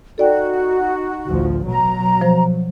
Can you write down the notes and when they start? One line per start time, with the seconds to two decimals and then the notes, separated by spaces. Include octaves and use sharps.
0.18 D#4 F#4 A4 D5 G5
1.28 A1 D2 F3
1.68 B2 F#3 A#5
2.21 F3 C5